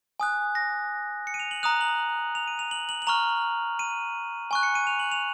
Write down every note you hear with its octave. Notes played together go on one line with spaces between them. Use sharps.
G#5 D#6 F#6
A#6
C#7
D#7
F7
F#7
A#5 D#6 F#6 F7
F7
F#7
F7
D#7
F7
F#7
F#7
F#7
A#5 C#6 F6 F7
D#7
G#5 C#6 F#6
C#7
D#7
F7
F#7
F7